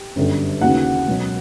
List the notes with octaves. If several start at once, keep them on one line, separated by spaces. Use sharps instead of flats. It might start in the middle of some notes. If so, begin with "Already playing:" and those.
Already playing: G4
G1 F#2 D3 G3
D#2 C#3 E3 F#4 F#5
C#2 B2 F#3